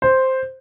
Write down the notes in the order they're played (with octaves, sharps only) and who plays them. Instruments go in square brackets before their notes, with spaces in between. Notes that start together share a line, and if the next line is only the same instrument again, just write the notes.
[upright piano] C5